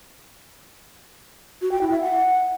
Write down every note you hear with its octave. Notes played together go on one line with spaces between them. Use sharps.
F#4
G5
E4
E5
F#5